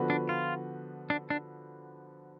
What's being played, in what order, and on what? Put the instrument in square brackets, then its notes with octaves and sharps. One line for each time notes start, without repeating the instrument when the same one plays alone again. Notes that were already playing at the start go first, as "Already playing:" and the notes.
Already playing: [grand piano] D3 F3 B3 F#4 B4
[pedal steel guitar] D4
F4
D4
D4